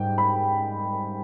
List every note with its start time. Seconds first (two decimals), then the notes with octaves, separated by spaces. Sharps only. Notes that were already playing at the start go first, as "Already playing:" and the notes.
Already playing: G#2 G3 G5
0.18 B5